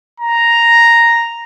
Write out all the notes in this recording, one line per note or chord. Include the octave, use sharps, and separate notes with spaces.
A#5